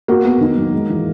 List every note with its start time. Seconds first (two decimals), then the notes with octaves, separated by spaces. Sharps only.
0.08 A#3 F#4
0.25 B3
0.41 D#3
0.57 F#3
0.73 G#3
0.90 E3